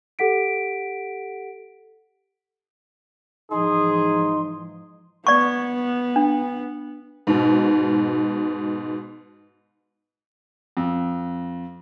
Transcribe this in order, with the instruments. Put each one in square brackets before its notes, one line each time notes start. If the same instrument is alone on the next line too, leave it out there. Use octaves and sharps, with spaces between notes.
[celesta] G4 A4 F#5 B6 D7
[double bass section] G#2 E3 F3 [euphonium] D#4 [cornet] G#4 [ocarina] C6
[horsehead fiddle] B3 [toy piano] D5 C#6
[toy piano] D4
[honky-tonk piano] G#2 B2
[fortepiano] F2